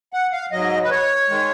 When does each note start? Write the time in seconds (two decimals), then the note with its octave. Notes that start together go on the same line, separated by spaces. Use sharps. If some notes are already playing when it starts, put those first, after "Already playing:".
0.13 F#5
0.32 F5
0.52 G#2 F#3 D#5
0.83 B4
0.90 C#5
1.29 D#3 G#3